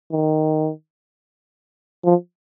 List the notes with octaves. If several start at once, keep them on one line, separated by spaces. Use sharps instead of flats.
D#3
F3